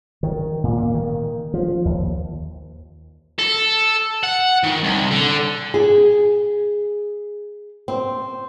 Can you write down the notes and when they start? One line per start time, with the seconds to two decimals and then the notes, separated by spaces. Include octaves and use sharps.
0.23 D#3
0.64 A#2
0.78 A#3
0.94 D#3
1.54 F3
1.85 D#2
3.39 A4
4.23 F#5
4.63 D#3
4.83 C2
5.11 D3
5.74 G#4
7.88 C4